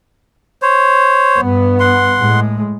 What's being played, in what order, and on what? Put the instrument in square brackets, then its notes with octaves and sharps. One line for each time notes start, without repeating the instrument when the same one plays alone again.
[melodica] C5 C#5
[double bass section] G2 B3
[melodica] F#5 C6
[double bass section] A2 G#3